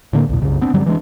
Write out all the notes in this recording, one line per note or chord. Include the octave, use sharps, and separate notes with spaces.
A2 D3 A#3
B1 E2 B2
C2 F#2 C#3
B3 C4 D4
G2 D3 F#3 G3
E3 G#3 D4